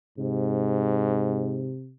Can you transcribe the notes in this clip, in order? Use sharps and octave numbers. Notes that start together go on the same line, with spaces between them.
G#2 C3